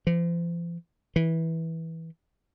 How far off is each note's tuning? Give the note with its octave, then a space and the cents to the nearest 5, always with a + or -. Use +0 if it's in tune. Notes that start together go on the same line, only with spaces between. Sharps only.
F3 -40
E3 -15